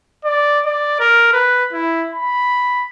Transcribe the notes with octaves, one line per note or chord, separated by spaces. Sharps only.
D5
D5
A#4
B4
E4
B5